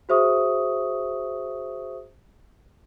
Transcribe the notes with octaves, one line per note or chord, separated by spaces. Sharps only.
F#4 G#4 C5 E5 C#6 D#6